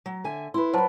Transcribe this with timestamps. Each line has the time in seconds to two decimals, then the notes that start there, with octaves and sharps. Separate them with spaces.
0.06 F#3
0.24 D3 E5 G#5
0.54 E4 B4 C6
0.74 F#3 B4 C5 A5